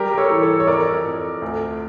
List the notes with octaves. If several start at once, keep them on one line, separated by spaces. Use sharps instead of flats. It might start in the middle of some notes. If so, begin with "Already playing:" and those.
Already playing: G3 G4 A#4
A#4
A4 C#5
E3
A4 C#5
C#5
F2 A#4 D5
F2
D2